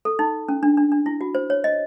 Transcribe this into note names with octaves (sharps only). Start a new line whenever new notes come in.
A4
D#4
C#4
D4
D4
D4
E4
F#4
C5
C#5
D#5